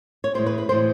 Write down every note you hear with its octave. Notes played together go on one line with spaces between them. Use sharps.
C#5
A2 E3 G#3 C5
B4
B4
A2 E3 G#3 C5